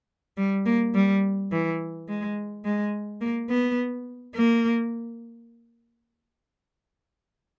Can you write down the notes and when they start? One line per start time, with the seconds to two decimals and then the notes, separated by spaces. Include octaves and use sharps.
0.37 G3
0.66 A#3
0.95 G3
1.52 E3
2.09 G#3
2.65 G#3
3.21 A#3
3.50 B3
4.35 A#3